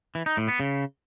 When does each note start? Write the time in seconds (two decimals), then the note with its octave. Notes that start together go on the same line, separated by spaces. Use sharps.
0.15 E3
0.26 D#4
0.37 A2
0.48 B3
0.60 C#3